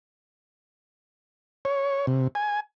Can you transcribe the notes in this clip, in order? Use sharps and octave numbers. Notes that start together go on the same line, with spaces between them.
C#5
C3
G#5